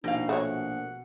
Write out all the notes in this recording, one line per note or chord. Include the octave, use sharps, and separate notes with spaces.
A#1 B2 D#4 F5
A3 F#4 C#5 F#5